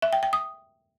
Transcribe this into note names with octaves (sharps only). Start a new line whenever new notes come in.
E5
G5
G5
D#6